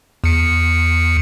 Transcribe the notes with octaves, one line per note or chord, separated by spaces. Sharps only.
E2 C#7